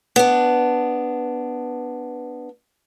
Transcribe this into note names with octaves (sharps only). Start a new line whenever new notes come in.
B3 D4